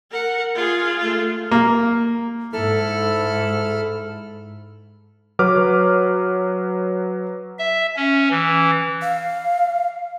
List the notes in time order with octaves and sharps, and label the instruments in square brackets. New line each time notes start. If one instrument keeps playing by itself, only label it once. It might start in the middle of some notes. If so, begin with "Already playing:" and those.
[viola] A#4 F#5
F4 G#4
A3 F4
[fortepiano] A#3
[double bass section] G#2 [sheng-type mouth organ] E4 B5 F6 [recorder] A4
[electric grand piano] F#3 B4 D6 F6
[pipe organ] E5
C#4
E3
[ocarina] F5